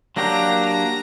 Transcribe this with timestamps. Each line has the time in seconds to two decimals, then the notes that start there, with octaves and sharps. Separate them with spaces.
0.16 F#3 A#3 D4 G4 A#5
0.65 A#5